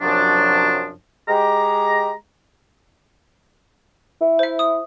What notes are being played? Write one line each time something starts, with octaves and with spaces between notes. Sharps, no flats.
F#2 C3 F3 F#3 D4
G#3 G4 A#5
E4
C5 E5
D#6